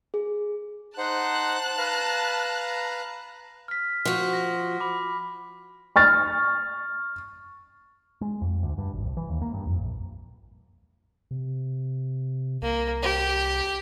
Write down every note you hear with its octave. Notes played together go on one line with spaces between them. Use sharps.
G#4
D#4 C5 F#5 A5 F#6
B4 F5 A#5
F6 B6
F3 F#4
A#6
B5 D6
C#6 F6 A6
G#3
F2
D2
G2
G#1
C2
E3
D#2
A#3
G2
F2
A#1
C3
C2 A#3
G4